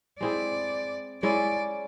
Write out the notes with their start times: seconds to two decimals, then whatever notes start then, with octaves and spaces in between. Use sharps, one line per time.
0.20 G#3 C4 E4 G#4 D5
1.22 G#3 C#4 E4 D5